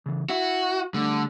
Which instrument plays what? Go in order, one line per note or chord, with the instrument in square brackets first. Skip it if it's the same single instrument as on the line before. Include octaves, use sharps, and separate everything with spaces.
[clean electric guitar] C#3 E3
[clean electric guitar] E4 E5 [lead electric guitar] F#4
[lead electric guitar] D3 [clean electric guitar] G3 A3